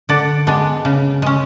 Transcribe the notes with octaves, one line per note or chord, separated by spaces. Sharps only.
D3 D5 F#5
G#3 B3 D4
C#3
G#3 C#4